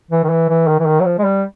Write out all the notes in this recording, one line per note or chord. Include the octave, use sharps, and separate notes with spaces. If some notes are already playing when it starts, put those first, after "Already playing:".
E3
D#3
E3
E3
D#3
E3
D#3
F#3
F3
G#3
G3